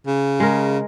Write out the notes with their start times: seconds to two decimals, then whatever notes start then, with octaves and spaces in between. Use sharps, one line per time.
0.07 C#3
0.40 G#3 A#4